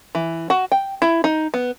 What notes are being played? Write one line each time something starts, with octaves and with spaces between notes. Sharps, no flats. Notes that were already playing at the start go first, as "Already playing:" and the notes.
E3
F#4
G5
E4
D#4
B3